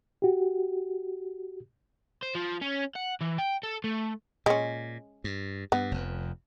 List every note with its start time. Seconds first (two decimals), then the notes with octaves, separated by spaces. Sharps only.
0.22 F#4 G4
2.23 C5
2.35 F3
2.62 C#4
2.95 F#5
3.21 E3
3.38 G5
3.63 A4
3.84 A3
4.46 A#2 G#3 C#4
5.24 G2
5.72 G2 B3
5.91 F1 F2